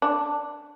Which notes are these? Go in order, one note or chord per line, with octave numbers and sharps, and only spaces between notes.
D4